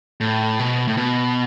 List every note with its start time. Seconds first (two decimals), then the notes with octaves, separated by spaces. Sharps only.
0.21 A2
0.59 B2
0.88 A2
0.97 B2